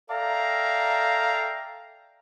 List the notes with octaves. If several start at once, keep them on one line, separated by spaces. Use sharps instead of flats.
A4 D5 E5 F5 G5 A#5